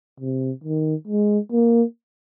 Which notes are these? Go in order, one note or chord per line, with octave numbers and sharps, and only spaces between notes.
C3
D#3
G#3
A#3